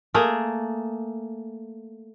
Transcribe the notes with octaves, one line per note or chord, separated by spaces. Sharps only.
A3 A#3 G#4